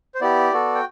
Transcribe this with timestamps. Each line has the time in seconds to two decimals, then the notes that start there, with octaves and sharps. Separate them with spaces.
0.15 C5
0.21 B3 E4 G4 D5
0.53 B3 F#4 A4
0.75 G5